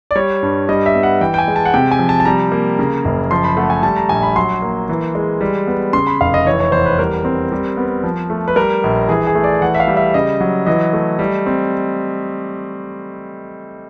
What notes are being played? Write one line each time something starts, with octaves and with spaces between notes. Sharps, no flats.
D5
G3 C#5
G2
G3 D#5
E5
B3
F#5
E3 G5
G5
G#5
G#3
A5
F#5
C3 G5
G#5
F3
A5
A5
G3 A#5
A#3
C#3
F#1
F3 C6
B5
A3 F#5
G#5
G3 A5
A#5
A#1 G#5
B5
F#3 C6
A#3
E3
G#3
G3
B3
C#3 C6
B5
F1 F5
D#5
E3 C#5
C#5
E2 C5
B4
G3 A#4
C4
G3
B3
F3
A3
B4
G3 A#4
A#1
E3 G#4
G#4
A3
D5
E3 F#5
E5
F5
G3
E5
C#3 D#5
F#3
E3 D#5
A3
G3
C4